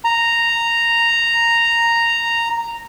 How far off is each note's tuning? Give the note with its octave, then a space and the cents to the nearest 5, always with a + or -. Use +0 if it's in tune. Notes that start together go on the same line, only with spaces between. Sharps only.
A#5 -5